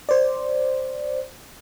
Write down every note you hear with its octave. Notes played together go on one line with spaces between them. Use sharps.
C5 D5